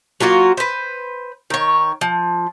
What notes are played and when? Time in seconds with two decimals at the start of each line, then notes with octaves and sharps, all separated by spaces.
0.20 F#3 A#3 F4 F#4
0.57 B4 C5
1.50 D#3 C#5
2.01 F3